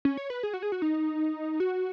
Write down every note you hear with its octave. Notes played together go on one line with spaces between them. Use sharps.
C#4
C#5
B4
G#4
F#4
G#4
F#4
D#4
F#4